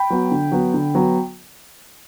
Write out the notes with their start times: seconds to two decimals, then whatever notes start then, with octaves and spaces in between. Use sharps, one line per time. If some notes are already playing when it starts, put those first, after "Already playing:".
Already playing: G5 B5
0.10 F#3 B3
0.31 D3
0.52 F#3 B3
0.74 D3
0.95 F#3 B3